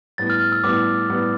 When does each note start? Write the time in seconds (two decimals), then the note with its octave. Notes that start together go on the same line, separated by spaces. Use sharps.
0.18 A2 G3 B3 A6
0.30 F6
0.41 F6
0.52 E6
0.63 A2 G3 B3 D6
1.09 A2 G3 B3